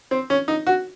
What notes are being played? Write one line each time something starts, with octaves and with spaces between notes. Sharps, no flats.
C4
C#4
D#4
F#4